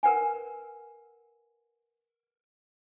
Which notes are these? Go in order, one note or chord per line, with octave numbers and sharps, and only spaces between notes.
A#4 B4 F#5 G#5